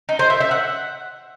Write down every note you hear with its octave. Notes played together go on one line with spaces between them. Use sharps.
D#4
C5
E5
E5
F#5